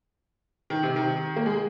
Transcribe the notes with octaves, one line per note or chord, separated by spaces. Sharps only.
D#3
C3
D#3
A#3
G#3